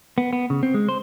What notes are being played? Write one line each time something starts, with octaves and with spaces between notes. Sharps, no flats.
B3
B3
C#3
C4
G#3
C5